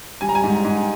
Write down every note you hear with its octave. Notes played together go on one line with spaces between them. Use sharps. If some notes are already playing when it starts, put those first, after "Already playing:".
G3 G#5
A#5
G#5
G#2
G#2